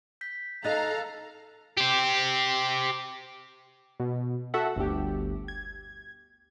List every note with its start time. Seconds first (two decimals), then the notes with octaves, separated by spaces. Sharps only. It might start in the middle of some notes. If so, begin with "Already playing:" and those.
0.21 G6 B6
0.64 D#4 A4 D#5 F5 A#5 F#6 A6
1.77 G4 C5
4.00 B2
4.54 F#4 A4 E5 F#5
4.76 G1 D2 G4
5.48 G#6